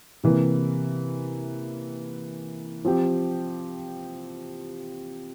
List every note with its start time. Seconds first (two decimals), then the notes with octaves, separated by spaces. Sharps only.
0.23 C3 E3 A#3
2.85 F3 C4 G4